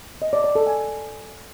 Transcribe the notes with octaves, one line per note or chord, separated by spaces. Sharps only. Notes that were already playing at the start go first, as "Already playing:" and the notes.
D#5
D5
D5
A4
G#5